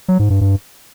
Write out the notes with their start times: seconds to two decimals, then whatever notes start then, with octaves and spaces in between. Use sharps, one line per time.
0.08 F#3
0.19 G#2
0.30 G2
0.41 G2